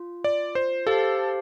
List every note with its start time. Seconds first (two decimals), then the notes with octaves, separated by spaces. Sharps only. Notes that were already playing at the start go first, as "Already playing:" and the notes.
Already playing: F4
0.24 D5
0.55 C5
0.87 G4 A4 C5 F5 A5